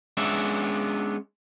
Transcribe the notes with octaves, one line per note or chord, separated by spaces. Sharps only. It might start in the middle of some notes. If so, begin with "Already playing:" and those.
G#3 B3 C#4 D4 E5